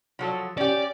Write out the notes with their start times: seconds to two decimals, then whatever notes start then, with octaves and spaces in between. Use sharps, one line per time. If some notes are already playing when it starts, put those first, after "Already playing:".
0.19 F3 F#3 A4
0.58 C#4 G4 D5